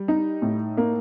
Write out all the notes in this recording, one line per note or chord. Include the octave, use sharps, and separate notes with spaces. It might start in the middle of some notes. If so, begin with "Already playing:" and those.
Already playing: G3
D#4
A2
A#3